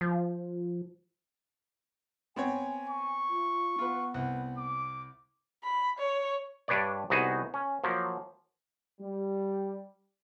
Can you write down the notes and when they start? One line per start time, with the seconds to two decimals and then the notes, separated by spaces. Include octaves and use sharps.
0.01 F3
2.36 B3 C4 C#5 G#5
2.89 C#6
3.29 F4
3.79 B3 F4 B4
4.14 C2 F#5
4.57 D6
5.64 B5
5.99 C#5
6.68 G2 D4 B4 C#5 D5
7.10 C2 B3 D#4 F#4 G#4
7.54 C#4
7.84 F3 F#3 A#3
9.00 G3